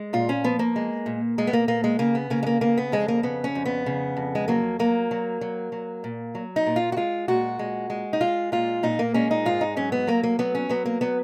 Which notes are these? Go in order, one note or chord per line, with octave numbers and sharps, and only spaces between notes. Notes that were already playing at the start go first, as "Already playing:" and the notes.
Already playing: G#3
A#2 F4
C#4
F3 B3
A#3
G#3
A#2
A#2 G#3
B3
A#3
A#2 A#3
G#3
C#3 A#3
B3
C#3 A#3
G#3
A#3
C#3 A#3
B3
F2 G#3
A#3
C#3 B3
C#4
F2
B3
C#3
F2
G#3
F#3 A#3
F#3 A#3
F#3
F#3
F#3
A#2
F#3
D#4
A#2
F4
F#4
G#3 F4
A#2 F#4
G#3
G#3
D#4
G#3 F4
A#2 F4
A#2 D#4
A#3
G#3 C#4
D#4
G#2 F4
D#4
F#3 C#4
B3
F#3 A#3
A#3
F#3 B3
C#4
F#3 B3
A#3
F#3 B3